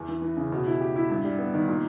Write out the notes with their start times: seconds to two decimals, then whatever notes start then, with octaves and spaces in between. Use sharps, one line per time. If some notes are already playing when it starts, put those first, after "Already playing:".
Already playing: E2
0.08 E3
0.22 E3
0.37 C#3
0.52 B2
0.67 E4
0.81 G4
0.96 E4
1.10 G2
1.24 G3
1.39 B3
1.54 D#3
1.68 A#2